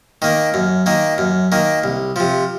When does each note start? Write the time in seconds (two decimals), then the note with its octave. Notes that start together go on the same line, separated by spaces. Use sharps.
0.22 D#3 A#3
0.54 F#2
0.86 D#3 A#3
1.18 F#2
1.52 D#3 A#3
1.84 C2
2.16 C3 F3